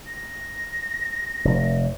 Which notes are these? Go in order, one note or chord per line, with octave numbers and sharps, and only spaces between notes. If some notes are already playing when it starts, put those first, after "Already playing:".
A#6
F1